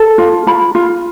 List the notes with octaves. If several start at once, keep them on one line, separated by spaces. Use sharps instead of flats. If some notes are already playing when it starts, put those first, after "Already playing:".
Already playing: A4
F4
F4 B5
F4